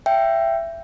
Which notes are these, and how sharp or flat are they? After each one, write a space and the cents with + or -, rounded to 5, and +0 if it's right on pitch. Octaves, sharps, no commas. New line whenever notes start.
E5 +20 G5 +0